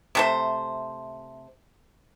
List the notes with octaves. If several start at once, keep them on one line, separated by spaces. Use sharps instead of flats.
C3 A3 C5